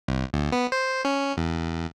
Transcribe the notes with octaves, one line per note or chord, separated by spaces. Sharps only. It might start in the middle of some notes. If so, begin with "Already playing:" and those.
C2
D2
B3
C5
C#4
E2